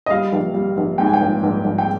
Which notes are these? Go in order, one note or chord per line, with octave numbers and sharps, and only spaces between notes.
D#5
G3 F5
A#1
G3
A#1
G#2 G5
G#5
G5
A#1
A#1
A#1
G5